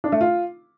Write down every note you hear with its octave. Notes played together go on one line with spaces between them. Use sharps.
D4
A3
F4